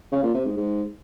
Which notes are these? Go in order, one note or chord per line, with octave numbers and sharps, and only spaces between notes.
C#3
A#2
C3
G#2
G#2